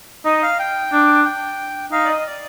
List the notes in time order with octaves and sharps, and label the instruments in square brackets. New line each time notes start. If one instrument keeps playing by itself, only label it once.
[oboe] D#4 [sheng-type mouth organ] D#5
[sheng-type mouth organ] F5
G5
[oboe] D4
[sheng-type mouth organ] G5
[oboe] D#4 [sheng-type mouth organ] F5
[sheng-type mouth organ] D5
D#5
D5